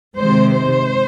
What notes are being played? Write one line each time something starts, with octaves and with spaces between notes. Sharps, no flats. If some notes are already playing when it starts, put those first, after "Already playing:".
C3 D#3 G#3 C5
C5